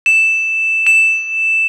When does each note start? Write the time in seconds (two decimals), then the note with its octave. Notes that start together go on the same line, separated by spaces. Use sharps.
0.06 E7
0.87 E7